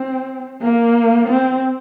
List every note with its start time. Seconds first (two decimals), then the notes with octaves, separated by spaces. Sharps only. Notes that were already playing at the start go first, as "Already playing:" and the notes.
Already playing: C4
0.62 A#3
1.28 C4